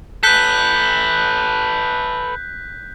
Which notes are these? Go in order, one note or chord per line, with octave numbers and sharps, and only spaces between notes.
A4 B4 F#6 G6 B6